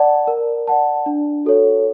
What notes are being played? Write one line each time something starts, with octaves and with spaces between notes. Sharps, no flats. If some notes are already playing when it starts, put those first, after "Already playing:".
Already playing: D5 F#5 A5
A#4
D5 F#5 A5
D4
F#4 A4 C#5